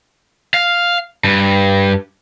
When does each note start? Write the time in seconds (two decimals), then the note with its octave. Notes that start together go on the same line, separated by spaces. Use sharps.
0.54 F5
1.24 G2